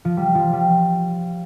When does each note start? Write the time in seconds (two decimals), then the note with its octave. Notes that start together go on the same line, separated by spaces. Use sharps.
0.05 F3
0.17 G3
0.35 F3
0.53 G3